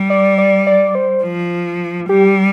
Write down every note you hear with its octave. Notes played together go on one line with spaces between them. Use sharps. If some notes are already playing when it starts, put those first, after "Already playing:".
Already playing: G3
D5
D5
D5
C5
F3
G3 G4